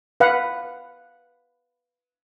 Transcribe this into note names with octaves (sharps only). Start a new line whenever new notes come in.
B4 F5 F#5